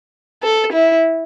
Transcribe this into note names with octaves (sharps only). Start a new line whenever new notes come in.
A4
E4